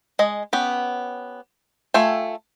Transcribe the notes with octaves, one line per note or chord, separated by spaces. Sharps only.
G#3 D#5
B3 C#4 G4
A3 F4 A4 G5 G#5